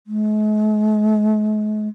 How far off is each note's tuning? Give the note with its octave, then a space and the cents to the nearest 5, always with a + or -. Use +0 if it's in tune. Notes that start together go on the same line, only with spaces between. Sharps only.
G#3 +45